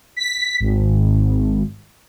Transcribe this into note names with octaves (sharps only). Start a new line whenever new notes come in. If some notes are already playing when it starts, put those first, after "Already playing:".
B6
G#1